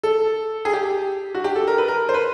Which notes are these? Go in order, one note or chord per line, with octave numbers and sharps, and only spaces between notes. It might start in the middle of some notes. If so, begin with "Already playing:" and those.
A4
G#4
G4
F#4
G4
A4
A#4
B4
A#4
C5
B4